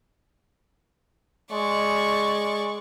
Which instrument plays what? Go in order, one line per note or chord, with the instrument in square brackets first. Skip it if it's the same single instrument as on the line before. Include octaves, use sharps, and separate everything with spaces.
[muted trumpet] G#3 [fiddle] D5 C#6